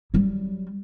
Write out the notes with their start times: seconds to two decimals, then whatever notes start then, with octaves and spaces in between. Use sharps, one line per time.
0.14 F#3 G3